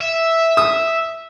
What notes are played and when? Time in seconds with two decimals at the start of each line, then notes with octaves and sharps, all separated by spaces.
0.01 E5
0.57 D#6